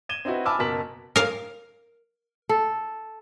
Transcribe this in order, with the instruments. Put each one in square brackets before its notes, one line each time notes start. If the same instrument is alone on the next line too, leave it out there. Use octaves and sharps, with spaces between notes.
[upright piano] G#6 D#7 E7 G7
C4 D#4 E4 F#4 B4
G#5 A5 B5 D6 E6 F6
F#1 B2 A#4 A5 B6 F#7
[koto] A#4 F5
[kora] A4